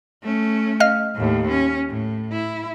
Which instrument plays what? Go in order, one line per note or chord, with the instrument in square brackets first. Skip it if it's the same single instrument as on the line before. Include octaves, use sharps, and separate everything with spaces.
[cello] A3 C#4
[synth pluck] D#5 F5 F6
[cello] D#2 A2
C#4
A2
E4